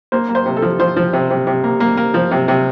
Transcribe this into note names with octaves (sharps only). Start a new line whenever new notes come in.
A#3 C5
A#3
C5
C3
A4
F3
F3 C5
F3
C3
C3
C3
A#3
A#3
A#3
F3
C3
C3